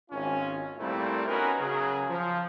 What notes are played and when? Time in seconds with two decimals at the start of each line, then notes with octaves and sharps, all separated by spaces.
0.11 G#1 C#4 F4
0.79 A#2 G3 A3 A#3 C4 E4
1.28 B3 C#4 D#4 F#4 A#4 B4
1.59 C#3 F#3 G#4
2.08 F3